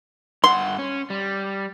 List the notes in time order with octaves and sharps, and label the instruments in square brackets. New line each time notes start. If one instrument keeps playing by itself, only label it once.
[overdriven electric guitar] G2 F#5 [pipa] C6
[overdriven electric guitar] C#4
G3